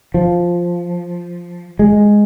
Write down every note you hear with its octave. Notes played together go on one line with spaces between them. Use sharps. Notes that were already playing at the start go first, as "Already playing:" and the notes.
F3
G#3